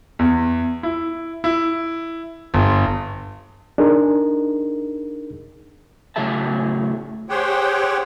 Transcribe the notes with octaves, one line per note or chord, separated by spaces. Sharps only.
E2
E4
E4
G1
D4 D#4 G#4 A#4
A2 C#3 F#3 G#4 E5 A5
G4 G#4 C5 C#5 F#5 G5